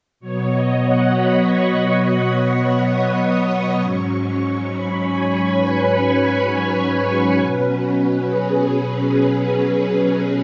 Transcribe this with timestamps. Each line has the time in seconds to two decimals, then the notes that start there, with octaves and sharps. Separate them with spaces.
0.20 B2 F#3 B3 C#5
0.50 D#5
0.80 F#5
1.10 B5
1.40 C#6
1.70 C#6
1.99 C#6
2.90 D#6
3.78 G#2 F#3 C#4 C#6
4.68 B5
4.99 G#5
5.28 C#5
5.58 B4
6.47 B4
6.77 C#5
7.07 B4
7.37 B2 F#3 C#4
8.26 G#4
9.15 B4
9.45 B4
9.76 G#4
10.06 B4